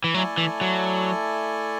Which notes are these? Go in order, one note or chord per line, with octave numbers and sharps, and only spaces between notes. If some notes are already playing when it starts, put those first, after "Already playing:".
E3
F#3 A3 E4 A4 D5 G#5
E3
F#3